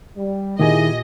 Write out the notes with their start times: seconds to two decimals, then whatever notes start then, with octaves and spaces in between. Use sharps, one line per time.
0.17 G3
0.59 A#2 D#3 E4 G4 G#4 D#5 G#5